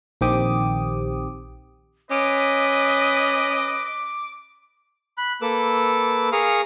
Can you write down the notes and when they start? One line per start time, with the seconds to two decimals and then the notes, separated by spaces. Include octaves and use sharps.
0.21 A#1 D#3 C4 G4 D6 D#6
2.11 C#4 B4 D#5 D6
5.18 B5 F#6
5.42 A#3 A4 B4 D6 E6
6.32 G#4 A#4 F5 C#6 D#6 F6